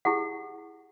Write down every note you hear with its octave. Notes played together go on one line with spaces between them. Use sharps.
E4 G4 G#4 F#5